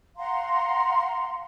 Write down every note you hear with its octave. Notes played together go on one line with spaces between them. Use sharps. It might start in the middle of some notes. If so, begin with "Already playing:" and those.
F5 F#5 A#5 C6